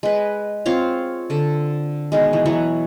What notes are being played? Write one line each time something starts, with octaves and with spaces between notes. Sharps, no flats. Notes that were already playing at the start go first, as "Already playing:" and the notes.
G#3 B4
C4 F4 C#5 F5
D3 A4
B2 D#3 G#3
E3
E3 F#3 C#5